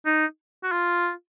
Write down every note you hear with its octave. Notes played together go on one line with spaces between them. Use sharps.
D#4
F#4
F4